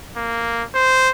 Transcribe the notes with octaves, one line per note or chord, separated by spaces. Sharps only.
A#3
C5